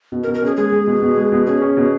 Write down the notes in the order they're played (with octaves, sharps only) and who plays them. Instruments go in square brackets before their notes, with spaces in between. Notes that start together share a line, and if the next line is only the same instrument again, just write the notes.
[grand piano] B2
[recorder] A#4
[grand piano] B2
[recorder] A#4
[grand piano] C#4 [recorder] G#4
[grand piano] G#3 [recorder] G#4
[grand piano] G#3
B2
B2
G#3
B2
[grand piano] C#4 [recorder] G#4
[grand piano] C#4
B2